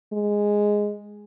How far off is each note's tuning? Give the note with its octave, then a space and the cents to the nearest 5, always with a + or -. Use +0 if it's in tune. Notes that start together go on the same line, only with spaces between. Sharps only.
G#3 -5